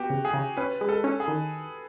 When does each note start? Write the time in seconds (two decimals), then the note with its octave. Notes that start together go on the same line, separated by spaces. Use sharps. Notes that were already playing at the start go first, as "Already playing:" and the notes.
Already playing: B3 F#4 G4
0.10 C#3
0.25 G#4
0.33 C#3
0.57 C#4 B4
0.81 G#3
0.89 A4
1.04 C#4
1.20 G#4
1.28 D#3